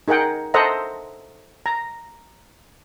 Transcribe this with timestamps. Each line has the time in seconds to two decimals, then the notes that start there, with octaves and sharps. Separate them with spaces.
0.08 D#4 G#4 A#4 F#5 G5
0.54 A4 C5 D#5 E5 F#5 A#5
1.66 A#5